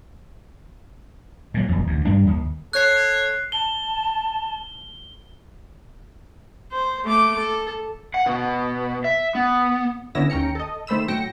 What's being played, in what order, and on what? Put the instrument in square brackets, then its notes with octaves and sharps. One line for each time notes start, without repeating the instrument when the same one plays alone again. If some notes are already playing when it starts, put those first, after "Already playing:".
[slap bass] A#2 F#3
D#1 F2
D2
G2 G3 D4
D#2
[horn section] A4 C#5 [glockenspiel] F#6 C7
[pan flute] A5 [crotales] G7
[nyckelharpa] C5
A3 D6
A4
[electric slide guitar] F#5
B2
E5
B3
[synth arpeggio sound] D3 B3 C#4 E4 E6 A#6
D#2 C#4 G5 A#5 C#7
A4 D#5
D#3 A3 C5 B5 E6 E7
A2 F#3 G5 A#6 C#7